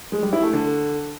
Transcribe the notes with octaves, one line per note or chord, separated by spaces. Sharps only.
G#3
G3
E4
A3
D3